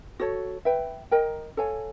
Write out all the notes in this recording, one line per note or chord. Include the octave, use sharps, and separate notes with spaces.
F#4 A4 C#5
B4 E5 G5
A#4 D#5 G5
A4 C#5 F5 G#5